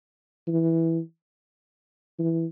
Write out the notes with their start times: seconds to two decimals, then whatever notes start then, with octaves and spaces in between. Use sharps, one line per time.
0.48 E3
2.19 E3